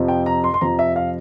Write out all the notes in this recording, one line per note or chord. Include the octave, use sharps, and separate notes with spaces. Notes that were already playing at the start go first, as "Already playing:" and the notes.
Already playing: F2 C3 F3
G5
A#5
C6
C6
F2 C3 F3 A#5
E5
F5